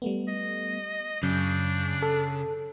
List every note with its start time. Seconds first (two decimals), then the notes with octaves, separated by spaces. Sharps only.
0.02 G3 A3 B3
0.28 D#5
1.23 F#2 C#3 D4 G6
2.02 A4